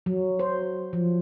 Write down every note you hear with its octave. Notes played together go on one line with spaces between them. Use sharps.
F#3
C5
F3